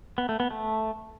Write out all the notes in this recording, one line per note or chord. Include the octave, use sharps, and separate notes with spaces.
B3
A3
B3
A3